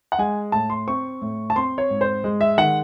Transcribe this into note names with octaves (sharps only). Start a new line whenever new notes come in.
F#5
G#3 G#5
A2 A5
C6
C4 C#6
A2
A5
C4 C6
C#5
G#2
C5
G#3
E5
D#3 F#5